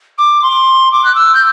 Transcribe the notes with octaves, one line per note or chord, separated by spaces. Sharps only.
D6
C6
D6
F#6
E6
G6